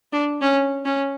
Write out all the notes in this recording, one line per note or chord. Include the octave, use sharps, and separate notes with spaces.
D4
C#4
C#4